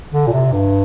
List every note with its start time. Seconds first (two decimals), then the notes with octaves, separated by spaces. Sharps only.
0.13 D3
0.27 A#2
0.33 C3
0.52 G2